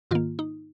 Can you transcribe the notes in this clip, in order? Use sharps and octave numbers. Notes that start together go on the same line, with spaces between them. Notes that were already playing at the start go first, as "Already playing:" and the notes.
G#2 D#3 A#3 F4
D#4